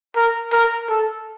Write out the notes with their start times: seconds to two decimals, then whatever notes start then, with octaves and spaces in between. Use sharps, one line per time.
0.16 A#4
0.52 A#4
0.89 A4